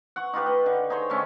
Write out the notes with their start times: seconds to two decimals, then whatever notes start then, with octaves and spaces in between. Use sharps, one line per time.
0.16 F#5 C#6
0.33 D#4 F4 G4 B4
0.46 D#5
0.66 D3
0.90 D#4 G#4 C5 C#5
1.10 D#3 A3 C#4